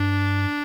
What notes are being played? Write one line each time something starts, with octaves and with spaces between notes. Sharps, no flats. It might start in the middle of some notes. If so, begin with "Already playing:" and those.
Already playing: G2 D4